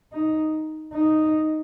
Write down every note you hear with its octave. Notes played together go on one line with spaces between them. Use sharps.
D#4
D#4